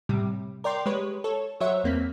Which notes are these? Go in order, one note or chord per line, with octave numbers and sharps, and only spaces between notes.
A2 C3 G3
A#4 D5 G5 C6
G#3 G4 B4 C#5
A4 C#5
F#3 C5 C#5 E5 F#5
E2 A#3 C4 B6